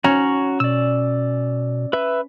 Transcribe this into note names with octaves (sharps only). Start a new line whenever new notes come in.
C#4 F#4 A#5
B2 D5 E6
B4 E5